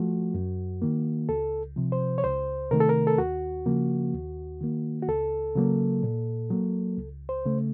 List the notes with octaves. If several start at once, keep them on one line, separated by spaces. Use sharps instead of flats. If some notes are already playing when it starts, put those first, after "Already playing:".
Already playing: F3 A3 F#4
F#2
D#3 A#3
C#2 A4
C3 F3
C5
C#5
C#2 C5
C3 D#3 A3 A#4
A4
A#4
A4
D#2 F#4
C#3 F3 A#3
D#2
D#3 A#3
F#4
C#2 A4
C#3 F#3 A#3
A#2
F#3 A#3
C#2
C5
C#3 A3